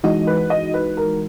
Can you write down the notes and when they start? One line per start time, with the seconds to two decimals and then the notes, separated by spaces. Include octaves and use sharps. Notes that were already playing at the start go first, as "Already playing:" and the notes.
0.04 E3 G#3 D#4 F#4 D#5
0.27 B4
0.50 D#5
0.74 B4
0.97 A#4